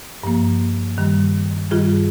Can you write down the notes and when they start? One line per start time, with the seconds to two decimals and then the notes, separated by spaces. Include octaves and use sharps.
0.23 G2 F3 A#3
0.98 G2 D#3 G3
1.70 G2 D#3 G3 F4 G#4